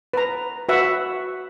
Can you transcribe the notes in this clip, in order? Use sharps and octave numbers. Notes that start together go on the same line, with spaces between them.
B4 A#5
F#4 B4 E5 F#5